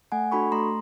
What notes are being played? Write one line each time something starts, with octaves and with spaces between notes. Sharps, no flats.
A3 F#5 G#5
D4 F#4 A4 B5 C#6
A3 A#5 C6